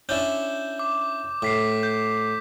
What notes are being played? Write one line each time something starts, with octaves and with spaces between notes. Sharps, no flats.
C#4 D4 E4 G6 E7
D6
A2 D6 B6 C7
G6